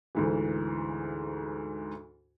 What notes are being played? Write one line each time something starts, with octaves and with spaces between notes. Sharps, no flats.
D2 G#2 E3